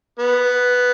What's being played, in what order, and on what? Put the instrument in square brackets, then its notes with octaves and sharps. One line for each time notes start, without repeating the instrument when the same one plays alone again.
[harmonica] B3